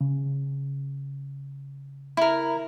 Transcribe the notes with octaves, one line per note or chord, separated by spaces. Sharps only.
C#3
E4 A#4